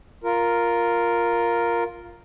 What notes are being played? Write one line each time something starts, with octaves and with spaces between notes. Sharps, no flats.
F4 A#4